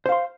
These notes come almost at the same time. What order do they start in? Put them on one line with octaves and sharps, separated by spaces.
C5 F5 C6